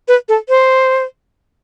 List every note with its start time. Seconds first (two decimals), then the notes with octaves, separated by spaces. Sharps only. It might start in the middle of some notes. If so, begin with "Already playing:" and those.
0.08 B4
0.29 A4
0.49 C5